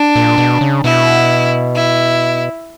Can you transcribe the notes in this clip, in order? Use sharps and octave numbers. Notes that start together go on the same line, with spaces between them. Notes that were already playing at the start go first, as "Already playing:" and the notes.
Already playing: D4
A#2
B2
C#3
B2 E4
E4